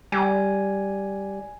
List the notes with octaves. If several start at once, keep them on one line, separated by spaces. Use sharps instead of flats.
G3 G#5